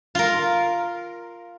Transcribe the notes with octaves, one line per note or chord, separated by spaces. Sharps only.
F4 A#4